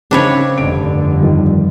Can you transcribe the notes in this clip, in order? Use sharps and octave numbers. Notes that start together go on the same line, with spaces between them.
C#3 C4 D4 D#4 B4 C#5
F1 G2 D3 D7
D#3 F3 G3